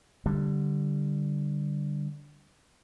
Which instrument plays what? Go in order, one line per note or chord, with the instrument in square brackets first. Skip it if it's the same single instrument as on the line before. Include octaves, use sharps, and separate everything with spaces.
[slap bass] D3 G3